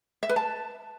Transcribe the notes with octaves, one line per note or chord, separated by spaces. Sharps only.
E5
B4
A5